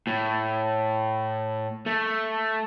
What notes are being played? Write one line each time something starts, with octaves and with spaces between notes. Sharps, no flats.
A2
A3